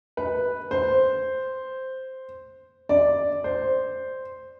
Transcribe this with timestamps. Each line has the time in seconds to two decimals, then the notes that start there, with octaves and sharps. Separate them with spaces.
0.17 B4
0.71 C5
2.89 D5
3.44 C5